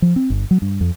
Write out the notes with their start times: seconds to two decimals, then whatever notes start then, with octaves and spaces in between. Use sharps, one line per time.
0.02 F3
0.16 C4
0.30 G1
0.51 F#3
0.62 G2
0.81 F2